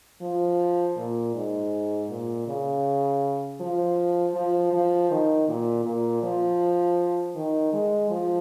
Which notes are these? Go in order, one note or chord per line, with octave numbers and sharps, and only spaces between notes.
F3
A#2
G#2
A#2
C#3
F3
F3
F3
D#3
A#2
A#2
F3
D#3
G#3
F3